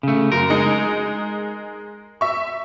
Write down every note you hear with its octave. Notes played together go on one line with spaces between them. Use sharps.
C#3 A3
F#2 A#4
G#3 D#4 C#7
E5 C#6